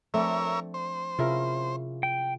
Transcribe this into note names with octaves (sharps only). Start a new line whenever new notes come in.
F3 A3 C4 D4 A#4 C#5 E5
C5
C3 C#4 E4 F4 G#4 A#4
G5